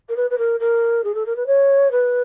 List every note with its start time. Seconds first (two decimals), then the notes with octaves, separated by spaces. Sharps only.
0.09 A#4
0.16 B4
0.30 B4
0.38 A#4
0.60 A#4
1.04 G#4
1.14 A4
1.26 A#4
1.36 B4
1.46 C#5
1.91 B4